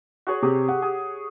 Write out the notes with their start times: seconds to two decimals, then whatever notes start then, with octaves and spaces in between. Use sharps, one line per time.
0.27 F#4 G#4 C#5
0.42 C3 G4 G#4
0.68 F#5
0.82 G#4